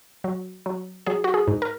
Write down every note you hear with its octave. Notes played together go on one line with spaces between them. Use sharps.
F#3
F#3
F#3 G#4
F#4
G#4
G#2
A#4